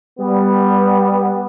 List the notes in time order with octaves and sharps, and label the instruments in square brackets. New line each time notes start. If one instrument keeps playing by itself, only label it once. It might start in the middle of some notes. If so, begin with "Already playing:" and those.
[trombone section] G3 B3